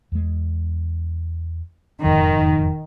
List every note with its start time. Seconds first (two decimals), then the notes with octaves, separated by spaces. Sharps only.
0.12 E2 G#3
2.04 E1 F2 G#2 D#3